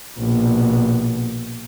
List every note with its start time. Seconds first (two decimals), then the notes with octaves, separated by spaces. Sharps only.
0.19 A#1 B2